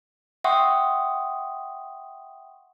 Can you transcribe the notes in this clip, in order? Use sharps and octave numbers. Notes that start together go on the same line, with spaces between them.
E5 F#5 G5 C6 C#6 D#6